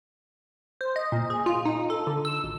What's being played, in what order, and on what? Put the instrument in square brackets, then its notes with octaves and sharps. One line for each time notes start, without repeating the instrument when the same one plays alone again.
[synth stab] C5
D#5
A#2
G#4
F4
D#4
A4
D3
E6
G#1